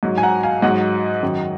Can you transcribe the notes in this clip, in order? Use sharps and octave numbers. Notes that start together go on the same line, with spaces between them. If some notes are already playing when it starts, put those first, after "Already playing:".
G#2 F#3
G#5
F#5 A#5
F5 G#5
G#2 F#3 D#5 F#5
F#2 D#3 F#3